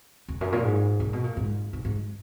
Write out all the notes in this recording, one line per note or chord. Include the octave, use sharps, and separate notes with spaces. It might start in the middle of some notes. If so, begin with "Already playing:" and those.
E2
F#2
A#2
G#2
A#2
B2
A#2
G#2
G#2
G#2